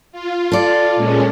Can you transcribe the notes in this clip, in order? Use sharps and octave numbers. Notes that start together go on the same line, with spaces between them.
F4
A4 D5
A#2 G#3 C#4